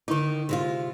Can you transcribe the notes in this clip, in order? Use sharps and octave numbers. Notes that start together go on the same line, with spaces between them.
D3 D#3 D#4 E4
C3 G#3 F4